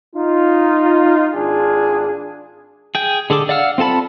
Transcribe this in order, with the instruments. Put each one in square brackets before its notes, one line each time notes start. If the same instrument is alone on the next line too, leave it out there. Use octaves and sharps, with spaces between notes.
[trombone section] D#4 F4
G#1 D4 F4 G#4
[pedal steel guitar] G#4 G5
D3 G#4 A4 D6
D5 F5 F#5 E6 F6
C4 F4 A4 A5 B5